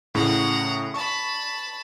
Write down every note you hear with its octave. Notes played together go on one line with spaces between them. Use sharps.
A2 C#3 F#5 A#5
A5 B5 C#6